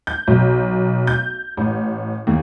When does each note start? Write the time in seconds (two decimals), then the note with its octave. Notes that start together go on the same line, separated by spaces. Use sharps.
0.07 G6
0.28 B1
1.07 G6
1.57 A1
2.27 D#2